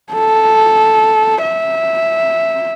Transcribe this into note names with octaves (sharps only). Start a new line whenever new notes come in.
A4
E5